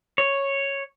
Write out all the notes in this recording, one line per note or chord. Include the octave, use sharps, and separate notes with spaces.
C#5